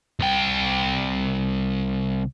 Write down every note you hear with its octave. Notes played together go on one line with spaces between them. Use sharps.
C2 G5